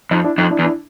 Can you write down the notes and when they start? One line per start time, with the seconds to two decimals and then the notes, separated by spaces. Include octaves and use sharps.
0.11 F2 D#4
0.24 D4 E4
0.38 F2 D#4
0.51 D4 E4
0.59 E2
0.64 D4 E4